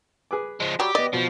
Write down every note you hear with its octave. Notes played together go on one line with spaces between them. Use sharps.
G#4 B4 D6
F3 G#3
F#3 G3 G4
B3 D5 D#5
B2 F3